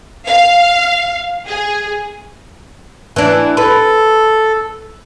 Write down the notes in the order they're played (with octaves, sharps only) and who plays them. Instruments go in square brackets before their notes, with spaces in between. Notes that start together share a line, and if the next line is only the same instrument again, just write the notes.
[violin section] F5
G#4
[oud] E3 D4
[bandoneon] A4 [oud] B4